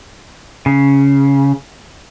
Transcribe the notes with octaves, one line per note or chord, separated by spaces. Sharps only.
C#3